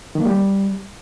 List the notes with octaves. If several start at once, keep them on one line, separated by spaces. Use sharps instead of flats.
D#3
A#3
G3